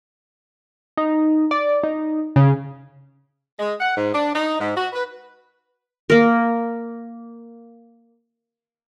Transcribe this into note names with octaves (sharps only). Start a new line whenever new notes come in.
D#4
D5
D#4
C#3
G#3
F#5
G#2
D4
D#4
G#2
F#4
B4
A#3 A#4